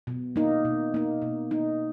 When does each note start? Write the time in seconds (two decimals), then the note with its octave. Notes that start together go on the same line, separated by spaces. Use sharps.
0.07 B2
0.36 A#3 D#4
0.65 B2
0.94 A#3 D#4
1.22 B2
1.51 A#3 D#4